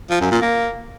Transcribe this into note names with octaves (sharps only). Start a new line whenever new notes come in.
F3
F#2
A#2
A#3